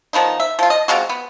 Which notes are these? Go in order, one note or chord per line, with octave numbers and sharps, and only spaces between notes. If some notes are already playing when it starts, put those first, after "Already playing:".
D#3 F3 B3 D#4
E5
F3 F4
D#5
C3 G#3 F4 F#4
B3